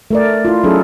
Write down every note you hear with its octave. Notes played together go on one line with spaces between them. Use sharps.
A3 A#4 D5
E4 F4
F#3 C#4 D#4 G#4 A4